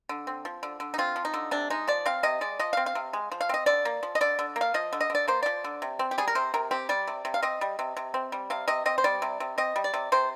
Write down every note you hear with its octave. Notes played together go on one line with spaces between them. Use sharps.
D3
C4
F3
D3
D3
D#4
C4 F4
F3
D#4
D3
C3 D4
G#3 D#4
F3 D5
C4 F5
C3 D#5
G#3 D5
F3 D#5
C4 F5
F5
C3
G#3
F3
F5
C4 D#5
D3 D5
A#3
F3
D#5
D3 D5
D3
A#3
F5
F3 D#5
D3
D#5
D3 D5
A#3 C5
F3 D5
D3
C3
C4
G4
G3 G#4
A#4
C3 C5
C3 A#4
C4 G4
G3 D5
C3
C3
F5
C4 D#5
G3
C3
C3
C4
G3
C3 F5
C3 D#5
C4 D#5
C5
G3 D5
C3
C3
C4 D#5
G3
D5
C3
C3 C5